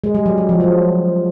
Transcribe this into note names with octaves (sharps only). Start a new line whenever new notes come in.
G#3
G3
F#3
F#3
F3
F#3